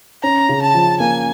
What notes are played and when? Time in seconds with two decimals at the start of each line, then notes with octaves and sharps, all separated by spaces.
0.23 C#4 A#5
0.49 C#3
0.62 A5
0.74 F3
1.00 A#3 G#5